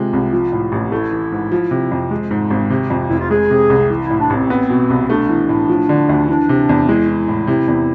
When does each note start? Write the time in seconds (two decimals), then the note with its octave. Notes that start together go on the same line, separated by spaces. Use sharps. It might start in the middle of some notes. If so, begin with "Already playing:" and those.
Already playing: C3 G#3 F4
0.13 C2
0.33 F3
0.52 A2
0.72 A1
0.92 A3 E4
1.12 E3
1.32 G#2
1.51 F3
1.71 C3
1.92 F2
2.11 G#3
2.31 G#2
2.50 G#1
2.70 C3
2.90 F2
3.09 F1 E4
3.20 F4
3.30 G#3 G#4
3.50 C3
3.70 C2
3.90 E3
4.05 E4
4.10 A2
4.20 D4
4.30 A1
4.35 C4
4.50 B3
4.70 B2
4.90 C2
5.10 A3 D4
5.29 E3
5.49 A2
5.69 F3
5.89 D3
6.09 D2
6.28 E3 D4
6.49 C3
6.69 E2
6.88 G#3 E4
7.08 E3
7.28 A2
7.47 C3 E4
7.68 E2